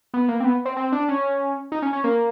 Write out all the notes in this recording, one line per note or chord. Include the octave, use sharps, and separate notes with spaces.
B3
A#3
C4
B3
C4
C4
D4
C#4
D#4
C#4
C#4
A#3